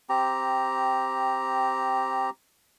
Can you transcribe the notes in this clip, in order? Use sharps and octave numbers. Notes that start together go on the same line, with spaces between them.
C4 G4 A#5